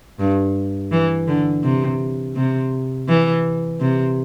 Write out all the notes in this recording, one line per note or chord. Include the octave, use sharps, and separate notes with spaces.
G2
E3
D3
C3
C3
E3
C3